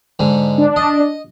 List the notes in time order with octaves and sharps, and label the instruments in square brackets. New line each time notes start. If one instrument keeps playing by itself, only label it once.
[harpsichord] G#2 D3
[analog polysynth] D4
[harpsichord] D#5